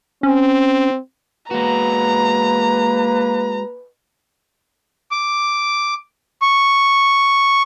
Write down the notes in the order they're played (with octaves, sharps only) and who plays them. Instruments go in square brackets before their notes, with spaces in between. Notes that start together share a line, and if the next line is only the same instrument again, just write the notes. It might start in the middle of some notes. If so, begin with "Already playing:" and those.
[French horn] C4 [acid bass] C#4
[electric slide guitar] G#3 F#4 [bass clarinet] A#3 [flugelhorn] B4 [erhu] A#5
[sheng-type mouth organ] D6
C#6